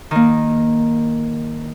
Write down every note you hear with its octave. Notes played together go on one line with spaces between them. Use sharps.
D#3 A#3